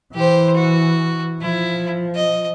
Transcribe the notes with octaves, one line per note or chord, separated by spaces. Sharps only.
E3 G4 C5
F#4
F3 E4
D#5